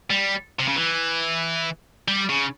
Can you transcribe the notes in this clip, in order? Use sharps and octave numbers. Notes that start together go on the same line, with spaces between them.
G3
C3
C#3
E3
G3
C#3